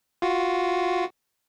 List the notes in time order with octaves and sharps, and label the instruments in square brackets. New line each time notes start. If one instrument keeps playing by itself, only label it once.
[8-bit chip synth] F4 F#4